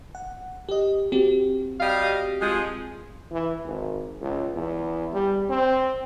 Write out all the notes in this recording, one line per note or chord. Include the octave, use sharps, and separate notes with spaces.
F#5
G4 D#5
C4 F#4 G4
G3 D#5 F5
F3 G#3
E3
G#1
C#2
E2
G3
C4